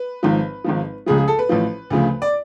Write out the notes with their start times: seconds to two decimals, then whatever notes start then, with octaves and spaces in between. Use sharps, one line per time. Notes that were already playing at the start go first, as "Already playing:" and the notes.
Already playing: B4
0.23 G#1 G#2 F3
0.64 G#1 G#2 F3
1.06 C#2 C#3 F3 G#4
1.18 G#4
1.28 A4
1.39 B4
1.49 A1 A2 F3
1.90 D2 C#3 F3
2.22 D5